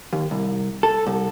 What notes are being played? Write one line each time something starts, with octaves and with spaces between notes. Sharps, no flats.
D#2
C2
A4
C2